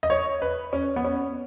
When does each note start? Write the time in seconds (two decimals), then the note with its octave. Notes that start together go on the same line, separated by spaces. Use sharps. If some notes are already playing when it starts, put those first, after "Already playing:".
0.03 D#5
0.10 C#5
0.42 B4
0.73 C#4
0.96 B3
1.04 C#4